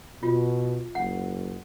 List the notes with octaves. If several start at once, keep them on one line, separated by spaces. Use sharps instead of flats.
B2 F4
F#1 F#5